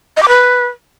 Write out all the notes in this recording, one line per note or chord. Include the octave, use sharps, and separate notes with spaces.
D#5
D6
B4